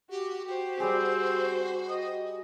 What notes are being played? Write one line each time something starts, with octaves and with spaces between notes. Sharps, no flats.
F#4 G4
F#4 G4 C5
G3 C4 G4 G#4 C5
D#5